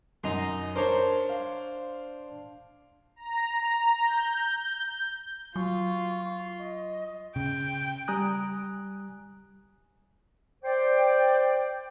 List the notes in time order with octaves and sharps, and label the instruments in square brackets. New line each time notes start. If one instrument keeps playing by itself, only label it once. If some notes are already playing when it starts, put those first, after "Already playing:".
[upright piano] F#2 [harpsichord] D#4 A#5 C6
[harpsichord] D4 C5 [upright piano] A#4 C#5
[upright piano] F5
[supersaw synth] A#5
G6
[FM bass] F#3 [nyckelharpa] F4 [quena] C#6
[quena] D#5
[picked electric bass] C#3 [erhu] G5
[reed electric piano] G3 G#5 A#5 D#6 F#6
[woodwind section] C5 D5 G5